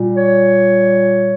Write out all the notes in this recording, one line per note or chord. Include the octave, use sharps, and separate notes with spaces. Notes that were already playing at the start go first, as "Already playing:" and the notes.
Already playing: A#2 G3
C#5